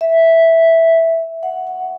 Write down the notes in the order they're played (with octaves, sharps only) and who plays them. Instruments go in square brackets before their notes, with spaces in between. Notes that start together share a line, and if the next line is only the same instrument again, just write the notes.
[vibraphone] E5
F#5
F#5